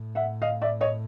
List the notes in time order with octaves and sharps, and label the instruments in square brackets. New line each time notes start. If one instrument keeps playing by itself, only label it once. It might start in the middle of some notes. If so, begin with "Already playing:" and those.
Already playing: [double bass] A2
[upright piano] E5 F#5
D#5 F5
D5 E5
C#5 D#5